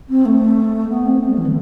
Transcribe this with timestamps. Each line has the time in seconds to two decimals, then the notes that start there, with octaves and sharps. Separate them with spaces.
0.09 C4
0.25 A3
0.89 B3
1.05 C4
1.21 A3
1.29 G3
1.37 E3
1.45 D3